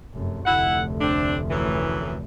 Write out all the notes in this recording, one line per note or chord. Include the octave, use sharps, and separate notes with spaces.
F1 F#2
F1 D2 E4 F#5
C4 D4
F#2 A2 E3